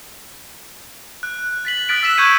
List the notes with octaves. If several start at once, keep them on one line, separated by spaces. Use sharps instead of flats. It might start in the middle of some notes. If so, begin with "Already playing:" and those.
F#6
A6 B6 F#7
D#6 F6 F#6 A6 B6 D7
E6 B6 E7
C#6 E6 G6 G#6 C#7 D#7